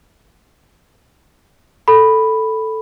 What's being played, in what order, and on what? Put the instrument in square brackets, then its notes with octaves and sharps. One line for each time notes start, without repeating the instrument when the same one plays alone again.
[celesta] A4 B5